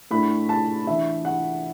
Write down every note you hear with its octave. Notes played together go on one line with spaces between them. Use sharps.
A2 A3 D4 B5
A5
E3 D4 E5
F#5